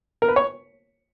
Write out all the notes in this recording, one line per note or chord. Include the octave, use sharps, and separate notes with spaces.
A#4
B4
C#5